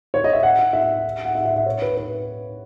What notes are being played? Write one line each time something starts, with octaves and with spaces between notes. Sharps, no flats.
C#5
D#5
E5
F#5
E5
F#5
E5
E5
E5
C#5
B4
B4